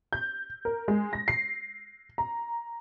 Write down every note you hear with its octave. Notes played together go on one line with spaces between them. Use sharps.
G6
A#4
G#3
A#6
C7
A#5